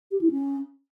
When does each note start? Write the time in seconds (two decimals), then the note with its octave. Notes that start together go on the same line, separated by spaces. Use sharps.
0.11 G4
0.21 E4
0.31 C#4